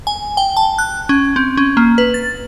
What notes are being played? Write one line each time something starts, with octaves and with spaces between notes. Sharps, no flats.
G#5
G5
A5
F#6
C#4
C4
C#4
A#3
B4
A6